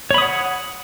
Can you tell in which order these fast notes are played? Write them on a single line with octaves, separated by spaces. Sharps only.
C#5 B5 D#6 F#5